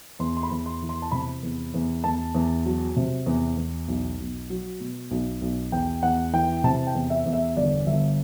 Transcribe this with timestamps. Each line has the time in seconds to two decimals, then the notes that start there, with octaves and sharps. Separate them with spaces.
0.19 E2 C6
0.37 C6
0.43 B5
0.51 E2
0.66 C6
0.82 E3
0.89 C6
1.02 A5
1.11 C3 B5
1.43 E2
1.74 E2
2.04 E2 A5
2.35 E2
2.66 F#3
2.96 C3
3.26 E2
3.57 E2
3.88 B1
4.18 B1
4.50 F#3
4.80 B2
5.11 B1
5.42 B1
5.72 E2 G5
6.02 E2 F#5
6.33 E3 G5
6.64 C3 A5
6.87 G5
6.95 E2
7.10 E5
7.26 E2
7.33 E5
7.57 G1 D5
7.87 G1 E5